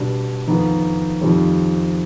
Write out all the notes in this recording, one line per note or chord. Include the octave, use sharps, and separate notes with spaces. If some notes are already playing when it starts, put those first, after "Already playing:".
Already playing: B2 G3 D4
F2 D#3 B3 D#4
F2 D#3 G3 C4